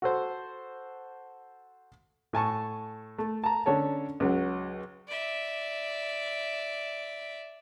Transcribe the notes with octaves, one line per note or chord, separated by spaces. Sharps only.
F#4 A4 C5
A2 G#5 A5 C#6
A3
A5 A#5
D3 C#4 A4 C#5 A5
C#2 F#3
D5 E5